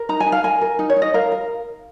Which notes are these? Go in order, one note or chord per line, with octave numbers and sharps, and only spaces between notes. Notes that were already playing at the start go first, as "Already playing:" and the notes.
Already playing: A#4
D#4 A#5
G#5
D#4
F5
A#4 G#5
A#4
D#4
C#5
D#4
D#5
A#4 F5
A#4